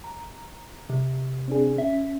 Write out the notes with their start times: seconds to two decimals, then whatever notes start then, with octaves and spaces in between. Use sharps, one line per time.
0.04 A#5
0.90 C3
1.48 C4 D4 G#4
1.78 C#4 E5